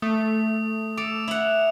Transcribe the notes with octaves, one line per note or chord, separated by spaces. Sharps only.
A3 D#6
A4 D6 D7 F7
E4 F#5
F7